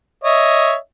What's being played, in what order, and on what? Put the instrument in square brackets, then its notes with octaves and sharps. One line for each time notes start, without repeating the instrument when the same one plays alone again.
[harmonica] C#5 D#5 E5